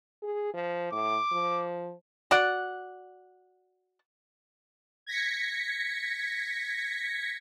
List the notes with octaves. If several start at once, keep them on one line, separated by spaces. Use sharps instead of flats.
G#4
F3
A2 D6
F3
F#4 D5 F#5
G#6 A#6 B6 C#7